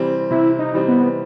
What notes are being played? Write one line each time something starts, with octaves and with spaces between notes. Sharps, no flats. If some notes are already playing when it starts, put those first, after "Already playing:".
Already playing: C3 E3 G3 C4
C3 E4
D#4
E3 G3 C4
B3